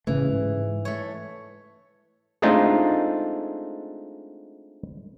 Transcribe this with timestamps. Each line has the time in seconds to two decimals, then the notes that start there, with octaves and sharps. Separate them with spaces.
0.07 A2 C#3 E3 A3
0.29 G#2
0.85 A3 C#5
2.42 G#3 A3 C4 D4 D#4 F4